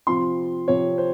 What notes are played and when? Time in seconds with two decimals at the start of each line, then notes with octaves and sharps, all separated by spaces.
0.07 C3 F3 C4 F4 C6
0.68 C3 F3 C4 F4 C#5
0.98 C5